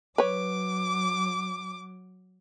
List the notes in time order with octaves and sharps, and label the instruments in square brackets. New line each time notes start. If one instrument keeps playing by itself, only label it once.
[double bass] F#3 [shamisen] B4 C#5 [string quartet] D6